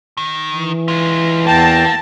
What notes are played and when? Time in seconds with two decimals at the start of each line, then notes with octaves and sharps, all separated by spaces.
0.17 D#3
0.52 E3
0.88 G#3 F4
1.47 E2 A#3 G5 A5